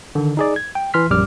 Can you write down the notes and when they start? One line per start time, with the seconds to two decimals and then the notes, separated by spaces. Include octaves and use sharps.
0.15 D3 D#3
0.37 D#4 G#4 D5
0.56 G#6
0.75 G5
0.94 E3 C6 F6 B6
1.10 A#1 F#2 G3 D6 F6